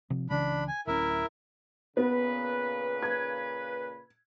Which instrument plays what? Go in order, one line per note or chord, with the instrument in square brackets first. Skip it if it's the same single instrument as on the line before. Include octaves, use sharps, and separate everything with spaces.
[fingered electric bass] C3 F3
[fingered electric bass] C#2 C#3 E3 [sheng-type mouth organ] D4 B5
[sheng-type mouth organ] G#5
[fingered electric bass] D1 C#4 [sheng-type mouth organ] E4 A#4 E5
[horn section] A#2 C#3 B4 [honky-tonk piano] B3
[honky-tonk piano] G#6